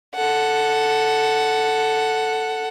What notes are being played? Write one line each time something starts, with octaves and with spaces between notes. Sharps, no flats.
A4 F#5